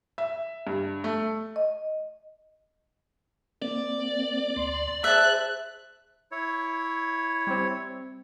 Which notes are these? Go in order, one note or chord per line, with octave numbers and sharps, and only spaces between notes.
E5
G2
A3
D#5
A#3 C4 D5
D2 C6
G#4 C5 E5 A5 F#6
E4 C#5
G3 C4